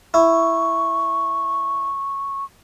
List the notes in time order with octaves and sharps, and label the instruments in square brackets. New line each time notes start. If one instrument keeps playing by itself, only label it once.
[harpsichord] E4 [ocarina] C#6